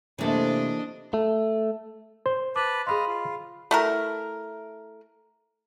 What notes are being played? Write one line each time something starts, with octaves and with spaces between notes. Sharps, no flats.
C3 E3 A3 A#3 D4 A4 D#5
A3
C5
B4 A5 B5 D6
G#4 D#5 F5 B5 C6
F4
A3 E4 A#4